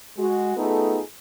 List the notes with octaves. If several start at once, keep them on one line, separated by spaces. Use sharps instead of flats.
G#3 F#4
A3 B3 D#4 F4 G#4 A4